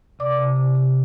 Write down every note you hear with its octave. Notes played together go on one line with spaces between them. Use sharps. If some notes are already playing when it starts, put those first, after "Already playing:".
C3 D5 D6
C3
C3
C3